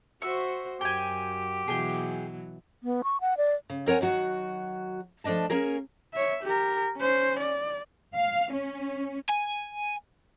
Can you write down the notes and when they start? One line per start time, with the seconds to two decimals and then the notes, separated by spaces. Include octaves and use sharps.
0.22 F#4 C5 E5 C#6
0.81 F#2 G4 G5 G#5
1.68 B2 E3 F#3 G#4 G5
2.83 B3
3.04 C#6
3.21 F#5
3.37 D5
3.70 C#3
3.86 C4 A#4 C#5 F#5 G#5
4.01 D#3 F#3 F#4 F#5
5.24 F3 A3 D4 D#5 A5
5.50 A#3 C#4 G#4 A#4
6.13 C#5 E5
6.43 G4 A#4
6.97 C#4 C5
7.40 D5
8.15 F5
8.53 C#4
9.29 G#5